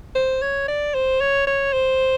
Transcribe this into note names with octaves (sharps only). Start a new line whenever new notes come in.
C5
C#5
D5
C5
C#5
C#5
C5